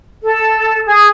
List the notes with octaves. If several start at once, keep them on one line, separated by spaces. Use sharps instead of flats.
A4
G#4